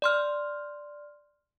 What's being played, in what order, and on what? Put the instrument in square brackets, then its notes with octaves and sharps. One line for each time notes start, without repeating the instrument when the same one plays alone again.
[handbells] D5 C6 F6